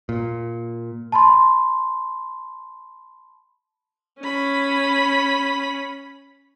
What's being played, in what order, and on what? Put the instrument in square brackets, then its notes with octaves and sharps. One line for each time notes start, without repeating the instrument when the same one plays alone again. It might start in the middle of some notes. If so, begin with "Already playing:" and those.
[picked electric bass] A#2
[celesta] A5 B5 C6
[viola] C#4 B5